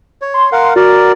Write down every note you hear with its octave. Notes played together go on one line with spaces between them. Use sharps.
C#5
C6
A#4 F5 F#5
F#4 A#4 D5